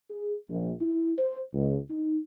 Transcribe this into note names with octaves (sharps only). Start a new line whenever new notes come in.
G#4
A#1
E4
C5
C#2
D#4